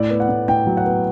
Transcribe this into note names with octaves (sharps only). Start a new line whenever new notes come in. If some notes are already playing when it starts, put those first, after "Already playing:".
Already playing: A2 D5
B3
F#5
A2
A2 G5
F#3
F#5
B3